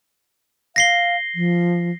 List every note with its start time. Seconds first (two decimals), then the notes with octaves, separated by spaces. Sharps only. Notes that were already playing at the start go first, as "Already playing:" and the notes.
0.76 F5 A#6 C7 G7
1.35 F3